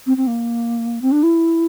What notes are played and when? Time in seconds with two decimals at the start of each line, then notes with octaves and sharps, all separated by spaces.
0.06 C4
0.17 C4
0.27 A#3
1.02 C4
1.12 D4
1.23 E4